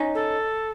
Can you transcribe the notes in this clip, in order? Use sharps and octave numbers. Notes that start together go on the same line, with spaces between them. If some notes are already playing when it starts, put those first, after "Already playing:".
Already playing: C#4 D#4
A4